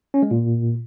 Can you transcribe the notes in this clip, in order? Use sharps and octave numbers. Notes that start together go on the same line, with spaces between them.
C#4
G#3
A#2